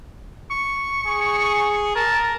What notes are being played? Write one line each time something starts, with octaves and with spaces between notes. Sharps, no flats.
C#6
G#4
A#4 A5